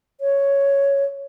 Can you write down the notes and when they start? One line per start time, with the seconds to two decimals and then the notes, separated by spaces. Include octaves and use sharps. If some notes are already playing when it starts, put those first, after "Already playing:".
0.21 C#5